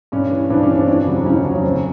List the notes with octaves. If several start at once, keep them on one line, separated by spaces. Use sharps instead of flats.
G2 C#4
E3
G2 C4 D4
C#4
E3
C4 D4
F2 C4 D4
C#3 F#3
F2 C#4 D#4
C#3 F#3 C#4
C#4
F#2 C4